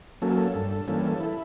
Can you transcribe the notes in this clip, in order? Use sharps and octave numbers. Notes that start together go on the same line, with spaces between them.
F#3 A#3 C#4 A4
G2
E3 G3 A#3 C#4
E4